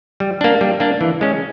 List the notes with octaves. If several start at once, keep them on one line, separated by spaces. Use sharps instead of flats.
G3
A#3 D4
G3
A#3 D4
E3
G#3 C#4